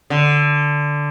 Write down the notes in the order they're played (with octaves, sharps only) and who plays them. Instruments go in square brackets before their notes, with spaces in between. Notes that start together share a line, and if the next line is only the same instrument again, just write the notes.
[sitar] D3